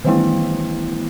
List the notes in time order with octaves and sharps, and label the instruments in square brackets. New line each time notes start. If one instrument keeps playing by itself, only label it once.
[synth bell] D#3 E3 G3 A3 B3 E4